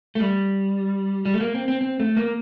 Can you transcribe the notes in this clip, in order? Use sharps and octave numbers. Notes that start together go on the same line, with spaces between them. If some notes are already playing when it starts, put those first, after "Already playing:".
A3
G3
G3
A3
A#3
C4
C4
C4
A3
A#3